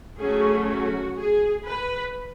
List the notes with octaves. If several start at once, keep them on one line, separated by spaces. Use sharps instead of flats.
F#3 A3 C#4 G#4
F#4
G#4
B4